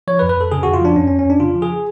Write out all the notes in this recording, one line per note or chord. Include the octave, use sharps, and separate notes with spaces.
F3 C#5
B4
F2
B4
F2 A4
C#3 G#4
F2 F#4
F4
F3 D4
F2 C#4
C#4
F2
C#4
F2 D4
C#3 F4
F3
G#4